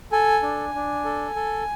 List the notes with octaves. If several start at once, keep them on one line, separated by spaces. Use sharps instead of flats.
A4 G#5
D4
D4
A4
A4